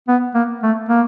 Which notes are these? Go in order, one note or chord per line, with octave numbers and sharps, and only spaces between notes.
B3
A#3
A3
A#3